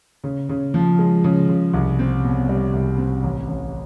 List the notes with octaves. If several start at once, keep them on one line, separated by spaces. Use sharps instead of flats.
C#3
C#3
F3
G#3
C#3
C#3
C2
C4
B2
G3
C2
C4
A1
A1